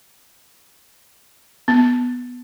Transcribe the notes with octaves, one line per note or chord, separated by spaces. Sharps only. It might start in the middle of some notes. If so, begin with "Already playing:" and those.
B3